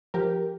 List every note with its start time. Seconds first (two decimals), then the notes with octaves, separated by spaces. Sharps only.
0.14 F3 G4 A#4